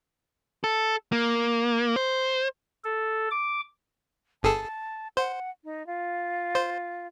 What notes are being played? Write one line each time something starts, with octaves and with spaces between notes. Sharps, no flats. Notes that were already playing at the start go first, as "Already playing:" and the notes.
A4
A#3
C5
A4
D6
G1 G#4 A4 A5
C5 F#5
D#4
F4
C5